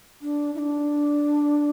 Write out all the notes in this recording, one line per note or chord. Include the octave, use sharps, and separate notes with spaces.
D4
E4
D4